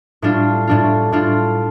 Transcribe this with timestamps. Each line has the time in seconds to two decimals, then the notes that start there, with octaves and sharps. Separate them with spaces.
0.22 A2 G3 D4 F4
0.67 A2 G3 D4 F4
1.12 A2 G3 D4 F4